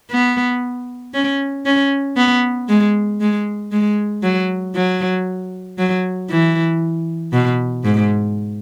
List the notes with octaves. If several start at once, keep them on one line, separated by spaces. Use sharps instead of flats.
B3
C#4
C#4
B3
G#3
G#3
G#3
F#3
F#3
F#3
E3
B2
G#2